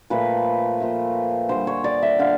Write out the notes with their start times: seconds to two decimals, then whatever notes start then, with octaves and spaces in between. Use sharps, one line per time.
0.10 A#2 F3 A3 B4
0.80 A#2 F3 A3
1.49 D3 G3 C5
1.67 C#5
1.84 D5
2.02 E5
2.19 D3 F5